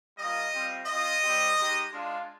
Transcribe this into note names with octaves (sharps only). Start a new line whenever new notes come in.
G3 A#3 F4 D#5
G3 C4 F4
C4 F4 D#5
G3 C4 G4
G#3 D#4 G4
G#3 D4 F4